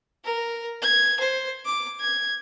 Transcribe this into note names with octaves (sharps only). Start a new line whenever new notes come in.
A#4
G#6
C5
D6
G#6